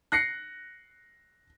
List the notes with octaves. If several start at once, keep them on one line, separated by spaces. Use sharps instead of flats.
F#6 A#6 C7 C#7